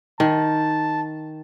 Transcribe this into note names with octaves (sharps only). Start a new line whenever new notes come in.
D#3 A5